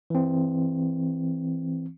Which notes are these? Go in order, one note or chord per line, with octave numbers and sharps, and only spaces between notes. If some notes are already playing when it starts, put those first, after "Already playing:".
E3 C4